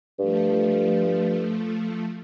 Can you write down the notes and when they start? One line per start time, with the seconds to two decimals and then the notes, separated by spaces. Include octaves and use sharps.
0.19 G2 F3 A3